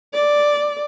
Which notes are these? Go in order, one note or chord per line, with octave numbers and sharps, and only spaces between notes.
D5